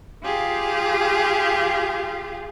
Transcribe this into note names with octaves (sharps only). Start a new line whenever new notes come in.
F4 G4 G#4 F5